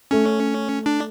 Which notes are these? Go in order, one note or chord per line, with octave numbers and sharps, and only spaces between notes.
A3 C#4
D4